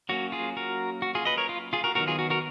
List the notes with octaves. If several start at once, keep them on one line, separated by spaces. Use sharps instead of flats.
F#3 A#3 C#4 F#4
F4 G#4
F#4 A#4
F#4
F4 G#4
B4 D#5
A#4 C#5
F4
F4 G#4
F#4 A#4
D#3 F#3 B3 F#4 A#4
F4 G#4
F#4
F#4 A#4